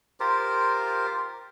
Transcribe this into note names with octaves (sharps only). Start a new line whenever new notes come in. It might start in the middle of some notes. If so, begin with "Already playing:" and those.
F4 G4 A#4 C5